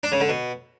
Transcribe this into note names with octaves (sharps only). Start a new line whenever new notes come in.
D4
C#3
D3
B2